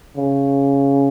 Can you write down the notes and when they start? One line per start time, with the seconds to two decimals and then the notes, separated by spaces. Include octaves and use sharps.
0.17 C#3